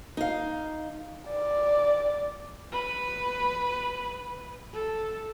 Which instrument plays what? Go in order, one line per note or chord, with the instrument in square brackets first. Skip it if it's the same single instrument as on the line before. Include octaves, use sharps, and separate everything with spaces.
[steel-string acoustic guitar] D#4 F5
[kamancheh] D5
[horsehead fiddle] B4
A4